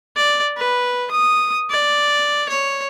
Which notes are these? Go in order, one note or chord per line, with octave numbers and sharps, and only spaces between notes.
D5
B4
D#6
D5
C#5